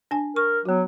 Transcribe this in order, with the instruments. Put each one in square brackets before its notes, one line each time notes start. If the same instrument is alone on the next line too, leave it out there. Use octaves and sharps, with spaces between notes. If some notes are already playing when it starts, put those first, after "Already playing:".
[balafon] D4 G#5
[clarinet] A#4 [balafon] C#6
[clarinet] F#3 [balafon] B3 F#4